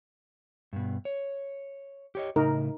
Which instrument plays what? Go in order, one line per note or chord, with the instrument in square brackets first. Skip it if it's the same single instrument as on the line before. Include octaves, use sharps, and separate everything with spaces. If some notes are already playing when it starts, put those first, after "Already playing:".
[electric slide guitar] G2 B2
C#5
G4 C#5 D#5
[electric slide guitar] A2 C#3 [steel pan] D#4 A#4